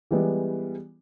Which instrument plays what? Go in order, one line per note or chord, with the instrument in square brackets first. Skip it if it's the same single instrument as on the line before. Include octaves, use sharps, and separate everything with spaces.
[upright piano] E3 G3 G#3 B3